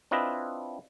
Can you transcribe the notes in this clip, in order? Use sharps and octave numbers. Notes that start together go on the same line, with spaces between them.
C4 D4 E4 F4 B4 D#5